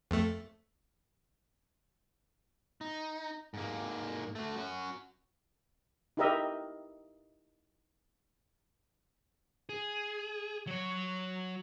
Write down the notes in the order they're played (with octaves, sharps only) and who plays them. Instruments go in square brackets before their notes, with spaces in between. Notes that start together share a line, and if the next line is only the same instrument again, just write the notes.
[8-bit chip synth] F2 A3
[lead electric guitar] D#4
G#2 A#3
A3 F#4
C#4 F#4
[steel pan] D#4 E4 G4 A#4 D#5 E5
[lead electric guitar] G#4
F#3 C#5